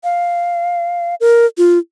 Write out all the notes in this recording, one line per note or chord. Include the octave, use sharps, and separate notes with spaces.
F5
A#4
F4